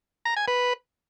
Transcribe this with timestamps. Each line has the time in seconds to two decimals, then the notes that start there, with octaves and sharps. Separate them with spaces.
0.25 A#5
0.37 G#5
0.48 B4